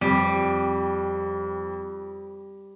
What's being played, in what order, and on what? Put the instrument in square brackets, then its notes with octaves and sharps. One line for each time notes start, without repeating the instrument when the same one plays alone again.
[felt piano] F2 [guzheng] G3